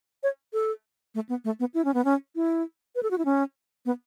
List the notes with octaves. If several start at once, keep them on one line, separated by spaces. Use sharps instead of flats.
C#5
A4
A3
B3
A3
B3
E4
C#4
B3
C#4
E4
B4
A4
F#4
E4
C#4
B3